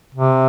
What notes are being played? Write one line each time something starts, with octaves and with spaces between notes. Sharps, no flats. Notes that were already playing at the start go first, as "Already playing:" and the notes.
C3